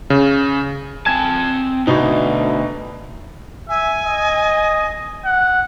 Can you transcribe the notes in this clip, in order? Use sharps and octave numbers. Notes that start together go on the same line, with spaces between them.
C#3
C4 G#5 A5 G#6
D2 B2 D#4
E5 G#5
D#5
F#5